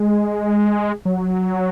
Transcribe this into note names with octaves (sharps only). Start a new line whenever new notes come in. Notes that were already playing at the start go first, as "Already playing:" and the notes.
Already playing: G#3
F#3